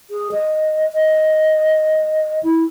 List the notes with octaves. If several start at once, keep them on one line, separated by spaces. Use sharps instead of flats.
G#4
D#5
D#5
E4